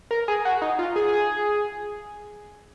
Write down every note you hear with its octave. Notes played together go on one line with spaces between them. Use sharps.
A#4
G#4
F#4
D#4
F4
G#4